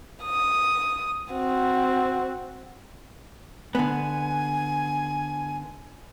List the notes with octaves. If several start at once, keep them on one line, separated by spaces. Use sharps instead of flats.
D#6
C4 F#4
D3 B3 G#5